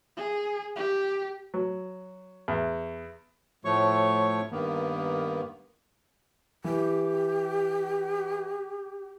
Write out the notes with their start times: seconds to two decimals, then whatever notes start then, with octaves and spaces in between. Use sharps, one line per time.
0.17 G#4
0.76 G4
1.54 F#3
2.48 E2
3.65 A2 F3 A3 C#5 C#6
4.51 G2 D#3 A#3 B3
6.64 E3 G4